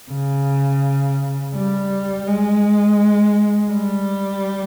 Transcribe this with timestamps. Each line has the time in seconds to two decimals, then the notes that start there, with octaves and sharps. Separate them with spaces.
0.11 C#3
1.55 G3
2.27 G#3
3.71 G3